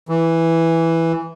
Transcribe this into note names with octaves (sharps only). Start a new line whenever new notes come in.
E3